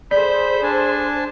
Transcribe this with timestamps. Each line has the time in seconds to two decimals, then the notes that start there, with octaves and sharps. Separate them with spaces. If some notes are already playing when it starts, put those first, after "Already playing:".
0.11 G#4 A4 C5 D5 B5 G6
0.63 D4 G#5 A5